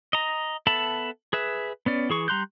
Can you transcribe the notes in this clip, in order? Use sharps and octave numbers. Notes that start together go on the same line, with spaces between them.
D#5 A#5
B3 A4 E5 A5 B5
G#4 B4 E5
B3 C#4 D5
E3 G#4 C#6
G3 A#5 C6 F#6 G6